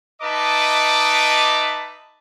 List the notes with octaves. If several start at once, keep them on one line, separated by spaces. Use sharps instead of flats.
D#4 B4 D#5 E5 A5 D6